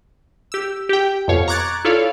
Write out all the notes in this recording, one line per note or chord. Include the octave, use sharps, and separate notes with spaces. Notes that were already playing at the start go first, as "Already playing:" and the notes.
G4 E6
G4 G5
F2 B2 C#5 F5
A#5 C#6 D6 F#6 G#6 A6
E4 F4 A4 C#5 D5 F5